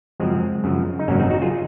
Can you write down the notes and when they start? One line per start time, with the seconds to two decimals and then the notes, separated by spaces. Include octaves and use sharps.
0.20 F#2 C#3 F3 G#3 C4
0.64 F#2 C#3 F3
0.99 D#4
1.08 G#1 F#2 C#3 F#3 A#3 C#4
1.20 C4 D#4
1.30 D#4 F#4
1.42 F4 G#4